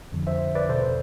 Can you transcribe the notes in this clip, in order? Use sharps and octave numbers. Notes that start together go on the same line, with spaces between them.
F2 D3 F3
C5 E5
B4 D5
E2 B2 A4 C5